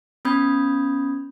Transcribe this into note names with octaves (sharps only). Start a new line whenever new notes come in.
B3 C#4 B5 D#6 G6 G#6